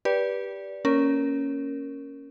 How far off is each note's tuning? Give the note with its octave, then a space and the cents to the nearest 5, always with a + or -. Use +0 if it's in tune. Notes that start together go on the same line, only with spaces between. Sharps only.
G4 +0 B4 -20 D5 -15
A#3 +0 C#4 +0 A#4 +0